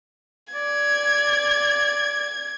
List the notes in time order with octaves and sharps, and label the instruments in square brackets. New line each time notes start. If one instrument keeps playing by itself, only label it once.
[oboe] D5 [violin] G#6